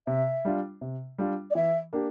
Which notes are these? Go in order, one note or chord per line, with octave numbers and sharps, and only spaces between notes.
C3 E5
G3 D4 F4
C3
G3 D4 F4
D5
E3 E5
A#3 D4 G4